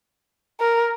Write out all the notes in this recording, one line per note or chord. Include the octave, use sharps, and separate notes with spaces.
A#4